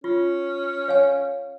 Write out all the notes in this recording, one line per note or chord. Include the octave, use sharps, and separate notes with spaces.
C#4 F4
C#5 F5 G#5